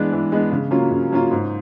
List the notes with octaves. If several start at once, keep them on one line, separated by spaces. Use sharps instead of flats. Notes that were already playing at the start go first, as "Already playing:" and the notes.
Already playing: E3 G#3 B3 D4
E3
G#3 B3 D4
C#3
F#3 A#3 C#4 F4
C#3
F#3 A#3 C#4 F4
G#2